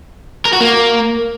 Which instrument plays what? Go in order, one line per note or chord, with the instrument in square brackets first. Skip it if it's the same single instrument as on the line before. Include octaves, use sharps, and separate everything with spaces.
[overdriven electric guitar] A#4
F#4
A#3